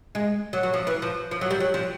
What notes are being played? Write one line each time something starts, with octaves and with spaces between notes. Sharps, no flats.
G#3
F#3
F#3
F3
E3
F3
F3
F#3
G3
F#3
F3